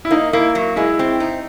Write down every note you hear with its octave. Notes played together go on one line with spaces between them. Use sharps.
E4
A#3 D#4
A#3 E4
F#3
G#3 E4
C4
D#4